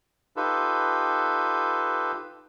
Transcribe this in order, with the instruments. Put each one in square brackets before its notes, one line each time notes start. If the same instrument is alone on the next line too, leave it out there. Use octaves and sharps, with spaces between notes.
[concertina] D#4 F4 G4 A4 B4